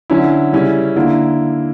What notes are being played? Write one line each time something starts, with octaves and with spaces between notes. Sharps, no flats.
D3 F#3 C#4 E4
C#3 G3 C#4 E4
D3 A#3 E4